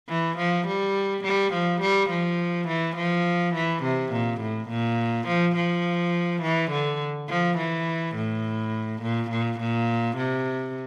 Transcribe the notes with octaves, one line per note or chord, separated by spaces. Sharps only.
E3
F3
G3
G3
F3
G3
F3
E3
F3
E3
C3
A#2
A2
A#2
F3
F3
E3
D3
F3
E3
A2
A#2
A#2
A#2
C3